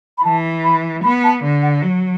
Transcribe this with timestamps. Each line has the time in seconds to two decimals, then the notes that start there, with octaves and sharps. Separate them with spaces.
0.18 B5
0.24 E3 A5
0.63 B5
1.03 B3 B5
1.24 A5
1.43 D3
1.63 F#5
1.82 F#3